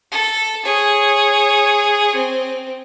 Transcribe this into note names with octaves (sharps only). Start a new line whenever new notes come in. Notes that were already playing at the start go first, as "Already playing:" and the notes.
A4
G#4 C#5
C4